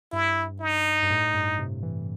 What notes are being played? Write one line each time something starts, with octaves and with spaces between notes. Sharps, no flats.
G2 E4
D#4
G2
A2
G2
C3
E3